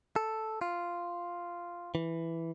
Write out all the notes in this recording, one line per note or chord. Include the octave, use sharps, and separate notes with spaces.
A4
F4
E3